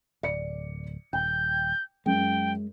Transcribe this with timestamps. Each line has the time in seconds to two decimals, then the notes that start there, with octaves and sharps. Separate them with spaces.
0.23 D1 D5 C#7
1.13 D#1 G5 G6
2.06 F#2 G#3 G5